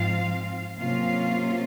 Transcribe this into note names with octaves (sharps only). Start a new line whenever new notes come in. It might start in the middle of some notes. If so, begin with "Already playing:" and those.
Already playing: G#2 F3 C4 F4 F5
C3 F#3 A#3 C#4 F4 F5